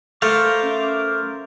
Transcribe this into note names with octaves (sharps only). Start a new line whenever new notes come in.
A3 A#4 C5 F5 D6
C#4 E5